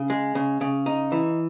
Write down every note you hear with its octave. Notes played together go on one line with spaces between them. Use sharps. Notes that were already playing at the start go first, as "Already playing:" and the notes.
Already playing: C#3
G#3
C#3
C#3
D#4
E3